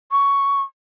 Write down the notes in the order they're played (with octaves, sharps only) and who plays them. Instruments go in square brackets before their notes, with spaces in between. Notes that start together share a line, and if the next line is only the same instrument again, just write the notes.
[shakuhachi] C#6